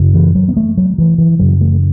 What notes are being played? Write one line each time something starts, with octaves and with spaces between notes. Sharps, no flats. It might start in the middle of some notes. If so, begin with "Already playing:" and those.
Already playing: F#2 C#3
E3
F#3
B3
A3
F#3
E3
E3
F#2 C#3 F#3
A3